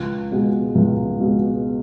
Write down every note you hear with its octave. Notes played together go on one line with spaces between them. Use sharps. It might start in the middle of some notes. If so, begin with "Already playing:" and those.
Already playing: C#2
B2 G#3
C#2
B2 G#3